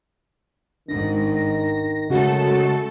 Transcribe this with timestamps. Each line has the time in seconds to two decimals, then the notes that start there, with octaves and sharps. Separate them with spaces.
0.88 G#1 G#2 D#3 D4 A#6
2.10 F#2 C#3 G#3 A3 F#4 A4